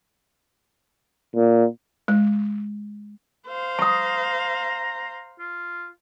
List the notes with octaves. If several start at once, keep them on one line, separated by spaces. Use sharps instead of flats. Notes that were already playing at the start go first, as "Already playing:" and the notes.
A#2
G#3
C5 F5
A#5 C#6 D#6
F4